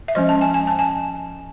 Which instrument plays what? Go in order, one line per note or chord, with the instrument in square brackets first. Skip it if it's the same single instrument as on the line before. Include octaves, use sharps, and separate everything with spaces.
[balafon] E5
F3 G#3 C#4 D#5
A5
G#5
G#5
A5
G#5